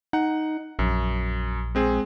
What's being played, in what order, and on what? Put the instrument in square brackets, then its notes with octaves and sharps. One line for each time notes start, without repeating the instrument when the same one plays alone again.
[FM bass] D#4 [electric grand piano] F#5
[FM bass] A#1 [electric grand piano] F#2
[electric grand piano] G#3 C4 G#4